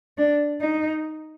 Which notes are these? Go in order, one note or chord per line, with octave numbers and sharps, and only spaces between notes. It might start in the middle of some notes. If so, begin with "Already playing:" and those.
D4
D#4